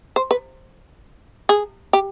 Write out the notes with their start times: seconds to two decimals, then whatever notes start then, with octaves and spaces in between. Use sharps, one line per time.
0.16 C5
0.31 B4
1.49 G#4
1.93 G4